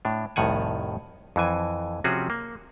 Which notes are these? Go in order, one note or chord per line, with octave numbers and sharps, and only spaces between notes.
A2 D4
C2 F2 A2 D#3 F#5 G#5
F2 E3 G#5
C3 F3 C4 C#4 F#4 G#4
A#3